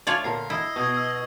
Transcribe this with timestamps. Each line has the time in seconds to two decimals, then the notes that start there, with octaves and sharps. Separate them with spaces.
0.07 A3 F4 C#5 D5
0.24 A#2 D3 A#4 C7
0.50 E4 D#5
0.76 B2 C#6 D#6 G#6
0.97 E6